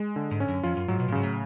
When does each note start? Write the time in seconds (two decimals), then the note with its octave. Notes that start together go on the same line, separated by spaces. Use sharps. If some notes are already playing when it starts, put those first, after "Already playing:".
Already playing: G#3
0.16 D3
0.31 G#2
0.40 C#4
0.48 F#2
0.63 F2 F4
0.76 F#2
0.88 G#2 F#3
1.00 B2
1.08 A2
1.12 G#2 C#3
1.23 A2